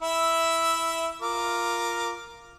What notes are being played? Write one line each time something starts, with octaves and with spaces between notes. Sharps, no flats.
E4 E5 E6
F4 A#4 D6